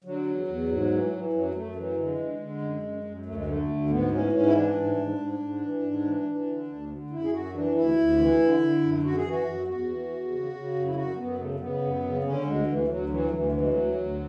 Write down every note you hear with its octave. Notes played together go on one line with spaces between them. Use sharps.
D3 F#3
E2
E2
G#2
E3
E3
F#2 F#3
F#2 A3
E3 F#3
D3 G#3
D3
D3
F#2
F#2
F#2
D2 A3
G#3
D3 A3
D2
G#2 B3
E3 C#4
G#2 C#4
E4
E3 D4
G#2
G#2
G#2
G#2
E3
G#2
E3
E3
D3
D2
D3
F#2 E4
G#4
F#2 F#4
E3 D4
D2 E4
D2
E3
D3
D3
F#2
F#2 F#4
G#4
E3 F#4
F#2
E2 F#4
E3
E2
C#3
C#3
F#2
E4
F#2 F#4
F#2 B3
C#3 A3
A3
C#3 B3
F#2
C#3
D3 C#4
D2 G#3
D2 E3
D2 F#3
E3 F#3
D2 E3
E3 F#3
G#3
F#3
D2
D2